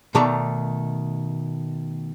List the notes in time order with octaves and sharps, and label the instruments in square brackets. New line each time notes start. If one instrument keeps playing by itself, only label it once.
[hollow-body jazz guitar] B2 D#3 A3 D5 A5 A#5